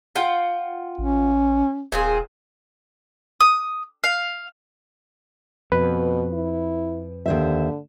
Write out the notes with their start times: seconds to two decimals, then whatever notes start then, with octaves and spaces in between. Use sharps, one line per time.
0.16 F4 F#5 G5
0.98 A1 C#4
1.92 D#1 A#2 C4 G#4
3.41 D#6
4.04 F5
5.72 F2 B2 B4
6.33 E4
7.26 D#2 D3 C5 E5